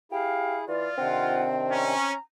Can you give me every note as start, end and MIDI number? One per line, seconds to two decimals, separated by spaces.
0.12 0.65 64
0.12 0.55 67
0.12 0.65 68
0.12 0.58 77
0.68 0.88 52
0.68 1.46 65
0.68 0.96 74
0.98 1.94 48
0.98 1.94 51
0.98 2.16 60
0.98 1.94 62
0.98 1.45 78
1.72 2.14 61
1.72 2.18 82